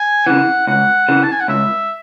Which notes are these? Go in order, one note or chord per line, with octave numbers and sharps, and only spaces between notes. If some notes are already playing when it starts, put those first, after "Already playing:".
Already playing: G#5
C#3 E3 F#5
C#2 F#5
C#3 E3
A5
G#5
F#5
C#2 E5